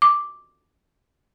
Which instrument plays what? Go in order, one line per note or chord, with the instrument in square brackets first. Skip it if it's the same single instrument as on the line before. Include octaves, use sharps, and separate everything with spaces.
[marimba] D6